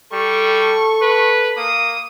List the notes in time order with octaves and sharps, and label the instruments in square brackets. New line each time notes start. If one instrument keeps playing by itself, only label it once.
[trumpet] G3 [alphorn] A4 [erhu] C#6
[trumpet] B4
[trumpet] A#3 [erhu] D#6